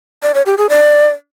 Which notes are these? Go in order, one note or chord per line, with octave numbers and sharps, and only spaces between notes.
D5
C#5
G4
G#4
D5